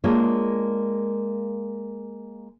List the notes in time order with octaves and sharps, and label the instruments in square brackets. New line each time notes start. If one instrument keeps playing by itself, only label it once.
[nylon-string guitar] G#3 A#3 D4 F4 C#5